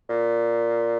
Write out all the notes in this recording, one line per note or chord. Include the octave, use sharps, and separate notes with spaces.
A#2